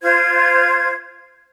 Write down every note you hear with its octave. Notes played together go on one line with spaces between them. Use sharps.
F4 C5 G#6